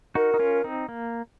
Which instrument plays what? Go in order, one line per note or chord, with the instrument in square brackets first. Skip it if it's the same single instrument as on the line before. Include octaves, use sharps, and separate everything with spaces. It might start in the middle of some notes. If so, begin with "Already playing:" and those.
[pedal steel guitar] D#4 F#4 [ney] A#4
[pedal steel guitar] D#4
C#4 F4
C4 D#4
A#3